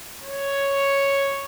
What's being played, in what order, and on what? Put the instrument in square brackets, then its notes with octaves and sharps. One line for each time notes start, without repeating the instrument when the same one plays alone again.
[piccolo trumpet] C#5